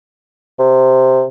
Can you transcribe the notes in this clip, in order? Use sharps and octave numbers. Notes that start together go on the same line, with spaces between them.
C3